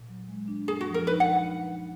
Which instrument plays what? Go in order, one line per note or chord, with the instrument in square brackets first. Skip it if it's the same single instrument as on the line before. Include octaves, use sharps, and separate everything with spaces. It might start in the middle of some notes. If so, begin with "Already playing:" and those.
Already playing: [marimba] A#2
F#3
G#3
D4
[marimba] F#2 [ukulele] G#4
[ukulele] F#4
[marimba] F3
[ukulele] A#4
[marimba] D#4 [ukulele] B4
[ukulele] F#5